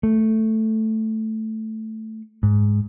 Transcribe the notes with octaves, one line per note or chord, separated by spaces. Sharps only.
A3
G#2